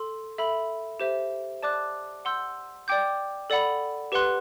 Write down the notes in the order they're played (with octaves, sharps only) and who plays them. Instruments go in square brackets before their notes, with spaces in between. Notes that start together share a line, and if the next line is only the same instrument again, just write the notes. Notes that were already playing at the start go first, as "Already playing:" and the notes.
Already playing: [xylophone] A4 C6
A4 E5 B5
G4 C5 E5
D5 A5 D6 F#6
F#5 C6 E6 G6
D5 G5 D6 G6
A4 D5 F#5 B5
G4 B4 F#5 C6 F#6